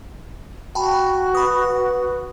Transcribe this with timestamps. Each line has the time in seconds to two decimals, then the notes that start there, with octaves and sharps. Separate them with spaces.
0.75 F#4 G5 A5 B5
1.35 B4 B5 D#6